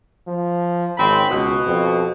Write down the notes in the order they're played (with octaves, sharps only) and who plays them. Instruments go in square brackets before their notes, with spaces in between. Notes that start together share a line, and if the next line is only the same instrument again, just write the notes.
[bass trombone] F3
[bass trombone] G#1 [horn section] C#3 C4 B5
[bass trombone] C#2 [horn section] B2
[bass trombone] F2